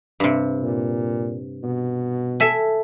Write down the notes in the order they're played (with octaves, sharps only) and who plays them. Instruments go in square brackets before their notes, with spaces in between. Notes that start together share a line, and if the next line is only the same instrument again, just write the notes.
[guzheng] G2 C3
[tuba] A#2
B2
[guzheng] A4 E5 G#5